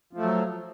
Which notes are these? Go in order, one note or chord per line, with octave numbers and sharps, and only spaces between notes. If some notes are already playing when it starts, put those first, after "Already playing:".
F3 F#3 A3